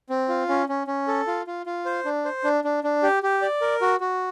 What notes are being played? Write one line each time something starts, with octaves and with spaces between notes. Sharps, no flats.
C4
F4
C#4
C#4
C#4
A4
F4
F4
F4
C5
D4
C5
D4
D4
D4
G4
G4
D5
A#4
F#4
F#4